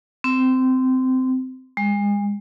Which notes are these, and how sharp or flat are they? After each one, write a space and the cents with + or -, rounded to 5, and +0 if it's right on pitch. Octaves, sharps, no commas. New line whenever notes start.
C4 -20
G#3 -35